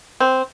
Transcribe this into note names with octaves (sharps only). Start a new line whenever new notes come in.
C4